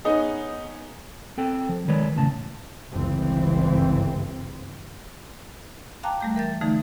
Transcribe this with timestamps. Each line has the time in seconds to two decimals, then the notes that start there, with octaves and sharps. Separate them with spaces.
0.05 B3 C#4 D#4 G#4 D#5
1.38 C4 A4 G5
1.69 F3
1.88 D#3 G#3 B4 C#5 D5
2.16 E2 A2 C#3 A5
2.91 G1 C#2 E3 C4
6.03 F5 G5 A5 A#5 D6 F#6
6.21 G3 A3 G6
6.35 E3 A#4 G6 A6
6.61 D3 E3 F3 A3 D#4